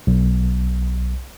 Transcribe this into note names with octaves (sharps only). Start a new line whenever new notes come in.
B1